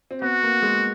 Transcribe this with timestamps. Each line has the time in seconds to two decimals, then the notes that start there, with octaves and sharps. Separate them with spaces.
0.11 C4
0.22 B3 F#4
0.43 A#3
0.62 G#3